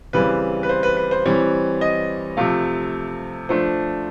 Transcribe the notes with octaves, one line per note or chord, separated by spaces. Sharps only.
C#3 E3 G3 C4 B4
B4
C5
B4
B4
C5
E3 G3 C4 C#5
D#5
C3 F3 A3 F5
F3 A3 D4 C5